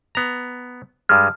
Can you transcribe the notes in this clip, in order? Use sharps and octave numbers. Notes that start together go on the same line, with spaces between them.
B3 A#5
G2 G3 G#3 F6